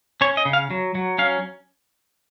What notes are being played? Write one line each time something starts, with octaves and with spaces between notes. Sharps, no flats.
C#4 C#5
D#5
C#3
F5
F#3
F#3
C#4 F5